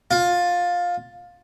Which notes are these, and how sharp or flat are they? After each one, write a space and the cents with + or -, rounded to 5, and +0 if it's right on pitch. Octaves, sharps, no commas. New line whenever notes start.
F4 +15